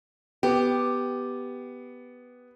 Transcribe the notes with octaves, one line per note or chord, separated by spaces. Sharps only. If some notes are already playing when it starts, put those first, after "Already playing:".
B3 G4